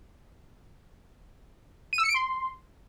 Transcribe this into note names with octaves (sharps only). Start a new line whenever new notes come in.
D#7
E6
C#7
D7
C6